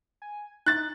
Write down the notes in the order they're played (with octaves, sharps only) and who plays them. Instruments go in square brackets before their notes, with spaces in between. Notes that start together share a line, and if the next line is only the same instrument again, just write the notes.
[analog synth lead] G#5
[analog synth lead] D#4 [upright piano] F#6 A6